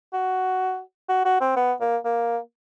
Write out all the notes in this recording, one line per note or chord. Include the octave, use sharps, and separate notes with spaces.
F#4
F#4
F#4
C4
B3
A#3
A#3